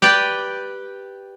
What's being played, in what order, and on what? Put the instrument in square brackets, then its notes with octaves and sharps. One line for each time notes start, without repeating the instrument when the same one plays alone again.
[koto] G4 B4 D5 G5